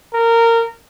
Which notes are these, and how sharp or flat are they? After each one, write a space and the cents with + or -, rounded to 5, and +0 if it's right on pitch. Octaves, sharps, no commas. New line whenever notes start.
A#4 -20